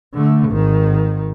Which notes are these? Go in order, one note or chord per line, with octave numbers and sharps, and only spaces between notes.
D3 A3
G#1 D#3